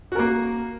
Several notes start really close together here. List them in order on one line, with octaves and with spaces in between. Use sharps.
F#4 A#4 A#3